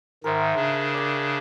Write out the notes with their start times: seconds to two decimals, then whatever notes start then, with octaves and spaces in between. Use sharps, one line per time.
0.24 G#2 D#3 A#4 C5 E5
0.55 C#3 D4
0.94 D5 G5